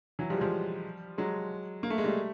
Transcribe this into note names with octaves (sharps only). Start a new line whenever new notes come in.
E3 F#3
F3 G3
G#3
F3 G3
F#3 G#3
A#3
A3
G#3
G3 A3